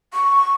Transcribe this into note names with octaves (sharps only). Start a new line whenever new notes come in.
C#6